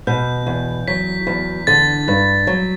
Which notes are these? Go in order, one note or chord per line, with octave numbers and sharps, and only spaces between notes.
B2 G6
E2
F#3 B6
E2
D3 A6
G2
F#3